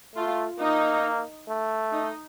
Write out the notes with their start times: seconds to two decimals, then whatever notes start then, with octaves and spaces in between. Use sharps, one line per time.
0.15 A3 F4
0.60 A#3 D#4
1.49 A3
1.92 D#4